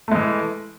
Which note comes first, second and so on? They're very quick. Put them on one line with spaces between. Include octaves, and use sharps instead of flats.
A3 G#3 E3